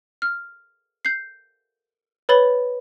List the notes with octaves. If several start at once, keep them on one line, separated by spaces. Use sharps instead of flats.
F6
G6 C7
B4 C#5 B5 A6 G7